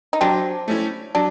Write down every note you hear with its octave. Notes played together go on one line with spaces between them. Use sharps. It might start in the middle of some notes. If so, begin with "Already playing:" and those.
D#4
F#3 C4 D4
A3 C#4 E4
F#3 D4